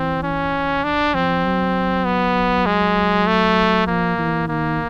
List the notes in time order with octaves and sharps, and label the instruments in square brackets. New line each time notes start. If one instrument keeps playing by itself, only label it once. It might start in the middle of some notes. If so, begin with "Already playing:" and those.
Already playing: [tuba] E3 [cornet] C4
[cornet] C#4
D4
[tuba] F3 [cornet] C4
[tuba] F#3
[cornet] B3
G#3
A3
[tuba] F3 [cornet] A#3
[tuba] E3
[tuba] D#3 [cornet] A#3